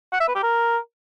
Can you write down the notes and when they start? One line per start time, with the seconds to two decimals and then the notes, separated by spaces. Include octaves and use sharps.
0.13 F#5
0.20 E5
0.28 B4
0.35 G4
0.43 A#4